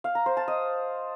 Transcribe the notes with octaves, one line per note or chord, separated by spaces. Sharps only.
F5
A#5
C5
A5
D#5